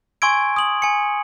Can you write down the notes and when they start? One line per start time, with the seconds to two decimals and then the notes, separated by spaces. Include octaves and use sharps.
0.22 G#5 C6 C#6 E6 G#6 D7
0.56 D#6 F#7
0.82 G#5 C#7